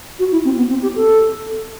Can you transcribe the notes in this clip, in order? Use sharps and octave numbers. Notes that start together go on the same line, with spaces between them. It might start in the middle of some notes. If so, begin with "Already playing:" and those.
F#4
E4
C4
B3
C4
G4
A4